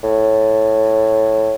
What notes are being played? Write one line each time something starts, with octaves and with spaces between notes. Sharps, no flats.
A2